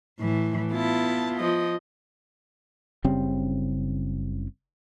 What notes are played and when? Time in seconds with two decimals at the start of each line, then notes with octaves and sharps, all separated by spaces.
0.20 A2 E3
0.73 B3 E4 F4 A5
1.39 F3 D#5
3.04 F#1 C#3 G3 C4